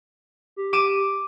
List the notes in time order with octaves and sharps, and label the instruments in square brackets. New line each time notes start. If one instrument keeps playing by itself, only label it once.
[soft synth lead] G4
[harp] D6 D#7 E7